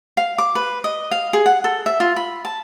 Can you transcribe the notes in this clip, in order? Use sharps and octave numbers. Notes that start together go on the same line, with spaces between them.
F5
D6
B4
D#5
F5
G#4
F#5
A4
E5
F4
B5
A5